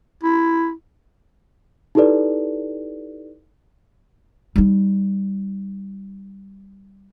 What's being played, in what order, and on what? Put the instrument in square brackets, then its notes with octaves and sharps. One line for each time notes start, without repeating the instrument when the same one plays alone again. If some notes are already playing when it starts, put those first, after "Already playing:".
[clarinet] E4
[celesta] D#4 E4 G4 A4 B4 D5
[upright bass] G3 D#4